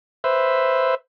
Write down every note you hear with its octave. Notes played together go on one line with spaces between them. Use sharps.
B4 C5 E5